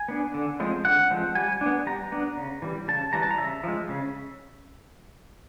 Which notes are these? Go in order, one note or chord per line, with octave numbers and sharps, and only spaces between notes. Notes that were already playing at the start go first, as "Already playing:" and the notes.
Already playing: G#5
B3 D4
D3
F3 G#3 C4
D3 F#5
F3 G#3 C4
G3 G#5
B3 D4
G3 A#5
B3 D4
C#3
E3 G3
C#3 A5
E3 G3 A#5
A5
A#5
C#3 E5
F3 G#3
C#3